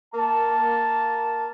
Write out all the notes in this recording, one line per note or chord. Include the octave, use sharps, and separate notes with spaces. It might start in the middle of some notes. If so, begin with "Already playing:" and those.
A#3 A5